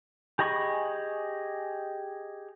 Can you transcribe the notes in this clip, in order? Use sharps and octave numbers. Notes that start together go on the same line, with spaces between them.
G4 G#4 D#5 B5 C#6